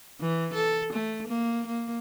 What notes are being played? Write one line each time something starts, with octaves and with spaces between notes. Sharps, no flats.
E3
A4
A3
A#3
A#3